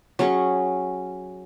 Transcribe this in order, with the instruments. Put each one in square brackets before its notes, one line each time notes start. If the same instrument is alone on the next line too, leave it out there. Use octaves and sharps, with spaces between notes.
[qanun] F#3 C#4 G#4 C#6